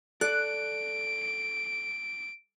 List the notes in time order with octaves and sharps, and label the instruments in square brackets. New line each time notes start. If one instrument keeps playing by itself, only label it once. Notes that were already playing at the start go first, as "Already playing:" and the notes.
[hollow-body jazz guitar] A4 D5 [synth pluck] F#6 [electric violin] D7